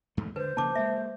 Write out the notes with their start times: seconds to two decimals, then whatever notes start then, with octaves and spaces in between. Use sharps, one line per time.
0.17 E2 G#2 A3
0.36 D3 B4 C5
0.57 C#3 F3 A#3 A5 D6
0.75 G#3 A#3 E5